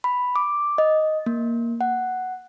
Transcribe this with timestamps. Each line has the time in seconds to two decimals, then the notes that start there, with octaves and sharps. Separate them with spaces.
0.04 B5
0.36 D6
0.78 D#5
1.26 A#3
1.81 F#5